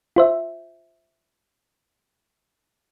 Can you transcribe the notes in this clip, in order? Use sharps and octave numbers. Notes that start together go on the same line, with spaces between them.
F4 C5 E5